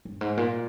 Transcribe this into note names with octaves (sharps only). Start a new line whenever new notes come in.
G2
G#2
A#2